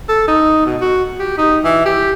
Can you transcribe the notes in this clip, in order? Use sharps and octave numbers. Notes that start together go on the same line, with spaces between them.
A4
D#4
B2
F#4
G4
D#4
E3
G4